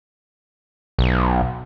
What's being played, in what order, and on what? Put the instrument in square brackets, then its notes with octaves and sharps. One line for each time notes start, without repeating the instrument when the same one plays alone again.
[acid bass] B1